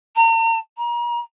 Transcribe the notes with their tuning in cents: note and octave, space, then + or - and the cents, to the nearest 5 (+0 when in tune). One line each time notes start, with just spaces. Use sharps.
A#5 -40
A#5 +35